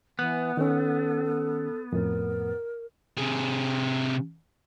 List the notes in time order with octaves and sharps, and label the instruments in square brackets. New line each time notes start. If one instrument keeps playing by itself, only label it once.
[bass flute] E3 [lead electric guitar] B3 [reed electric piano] F#6
[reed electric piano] D#3 C#4 [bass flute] A4
[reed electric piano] F2 A2 [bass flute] A#4
[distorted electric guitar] C3 G#4